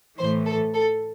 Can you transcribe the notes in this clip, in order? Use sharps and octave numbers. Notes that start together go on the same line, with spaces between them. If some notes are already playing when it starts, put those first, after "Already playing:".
A2 E3 C5
A4
A4